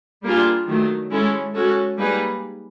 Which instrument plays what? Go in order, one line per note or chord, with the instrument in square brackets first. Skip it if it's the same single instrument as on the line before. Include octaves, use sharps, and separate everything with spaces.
[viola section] G3 A#3 D4 F4 G#4
D#3 F#3 A3
G#3 C#4 E4 A4
G#3 C#4 F#4 A4
G3 A#3 D#4 G#4 B4